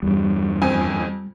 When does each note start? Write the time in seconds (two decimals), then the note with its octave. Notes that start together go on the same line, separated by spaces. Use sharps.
0.03 E2 G2 G3
0.62 F2 C4 G#5